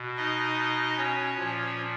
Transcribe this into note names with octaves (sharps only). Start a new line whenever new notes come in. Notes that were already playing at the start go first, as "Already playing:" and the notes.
Already playing: B2
D#4 D#5
C#4 C#5
A#2 F3